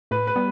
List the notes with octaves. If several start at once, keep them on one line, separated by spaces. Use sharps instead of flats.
A2 B4
B4
G3 B3